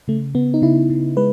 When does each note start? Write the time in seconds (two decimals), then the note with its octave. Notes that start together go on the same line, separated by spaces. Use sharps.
0.08 C#3 A3
0.35 C#3 B3
0.54 D#4
0.62 C#3 E4
0.90 C#3
1.17 G#3 B4